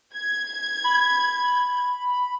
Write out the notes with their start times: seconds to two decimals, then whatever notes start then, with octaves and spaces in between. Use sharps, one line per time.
0.14 G#6
0.84 B5